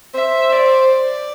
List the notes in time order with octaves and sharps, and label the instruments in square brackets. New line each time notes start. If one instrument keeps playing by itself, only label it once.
[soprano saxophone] C5 [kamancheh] E5
[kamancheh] D5